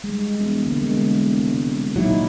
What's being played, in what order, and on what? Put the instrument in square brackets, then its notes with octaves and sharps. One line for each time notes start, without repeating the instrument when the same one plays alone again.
[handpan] G3 G#3
[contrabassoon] E1
[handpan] D3 G#3 A#3
C3
[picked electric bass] A#2 F#3 [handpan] D#4 E4 C#5